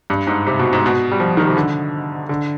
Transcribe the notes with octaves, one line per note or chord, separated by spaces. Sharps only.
G2
G#2
C3
B2
G#2
B2
G3
F3
D#3
C3
D3
D3